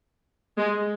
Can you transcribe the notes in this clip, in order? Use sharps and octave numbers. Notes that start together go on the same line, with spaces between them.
G#3